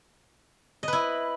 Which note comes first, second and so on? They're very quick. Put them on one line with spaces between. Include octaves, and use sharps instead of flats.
D#5 B4 E4